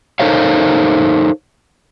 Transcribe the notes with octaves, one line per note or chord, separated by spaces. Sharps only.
D#4 A4 A#4 C5 C#5 F5